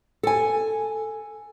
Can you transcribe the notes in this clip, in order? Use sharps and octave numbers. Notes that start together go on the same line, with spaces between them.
A4 G#5